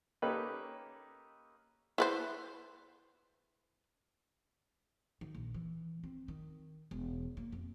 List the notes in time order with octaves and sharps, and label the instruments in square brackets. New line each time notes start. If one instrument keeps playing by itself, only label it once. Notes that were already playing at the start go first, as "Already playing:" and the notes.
[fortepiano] A#3 C#4 D#4 G4 A4 B4
[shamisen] E4 B4 C5
[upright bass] D#3
A#1
E3
C4
D#3
E1
A#3
F2